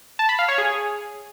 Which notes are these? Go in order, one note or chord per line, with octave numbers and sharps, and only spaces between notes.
A5
B5
F5
C#5
G#4